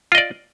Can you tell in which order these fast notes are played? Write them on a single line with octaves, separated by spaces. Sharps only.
F4 D#5 D5